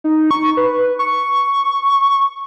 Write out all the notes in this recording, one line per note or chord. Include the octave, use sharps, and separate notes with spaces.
D#4
C#6
B4
C#6